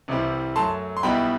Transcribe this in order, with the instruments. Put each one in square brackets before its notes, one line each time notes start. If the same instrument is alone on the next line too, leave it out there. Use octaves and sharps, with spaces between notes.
[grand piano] C2 C3 E3 G3 C4
F#2 F#3 A3 A5 C6
C6
B1 B2 G3 B3 E4 G5 B5